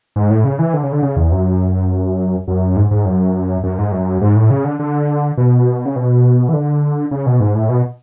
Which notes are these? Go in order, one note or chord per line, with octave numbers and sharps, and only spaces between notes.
G#2
A2
C#3
E3
D3
C#3
D3
C#3
E2
F#2
F#2
G#2
G#2
F#2
F#2
G#2
F#2
G#2
A2
C#3
D3
D3
B2
C#3
B2
E3
D3
C#3
B2
G#2
A2
B2